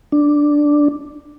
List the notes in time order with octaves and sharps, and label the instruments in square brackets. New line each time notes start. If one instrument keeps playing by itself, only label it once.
[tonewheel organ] D4